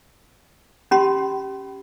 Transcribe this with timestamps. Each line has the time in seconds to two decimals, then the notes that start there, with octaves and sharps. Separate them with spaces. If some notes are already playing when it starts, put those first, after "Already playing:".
0.91 C#4 G4 B5 C6